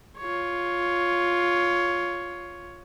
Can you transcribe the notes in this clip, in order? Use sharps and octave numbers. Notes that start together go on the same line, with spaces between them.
F4 C#5